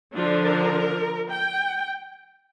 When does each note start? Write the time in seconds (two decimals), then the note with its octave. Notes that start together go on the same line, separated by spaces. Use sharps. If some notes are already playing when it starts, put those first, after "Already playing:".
0.14 D3 F3 D4 F4
0.43 A#4
1.29 G5